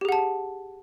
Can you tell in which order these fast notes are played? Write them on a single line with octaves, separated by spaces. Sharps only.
G4 G#4 F#5 A5